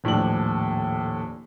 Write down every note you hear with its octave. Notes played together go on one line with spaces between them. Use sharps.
D#1 A2 F3 D4 F#7